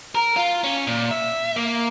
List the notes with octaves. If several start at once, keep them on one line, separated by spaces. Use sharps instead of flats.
A#4
F4
C#4
A#2
E5
A#3